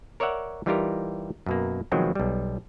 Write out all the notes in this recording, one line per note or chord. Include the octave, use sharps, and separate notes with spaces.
A#4 C#5 D5 E5 F#5
E3 G3 D#4 F4 G4 A#4
F#2 B2 A#3
B2 D#3 F3 F#3 G#3 C4
B1 G3